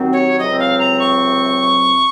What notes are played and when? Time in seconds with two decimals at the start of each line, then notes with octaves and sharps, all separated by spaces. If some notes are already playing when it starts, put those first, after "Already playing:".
Already playing: D#2 D#3 F#3 C4
0.13 C#5
0.39 C#2 C3 F#3 C4 D#5
0.60 F5
0.79 A#5
1.00 C#6